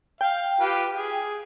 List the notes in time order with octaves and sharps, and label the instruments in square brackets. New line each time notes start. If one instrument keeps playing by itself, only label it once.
[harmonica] F5 [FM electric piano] G5
[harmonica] F4 G4 B4
G#4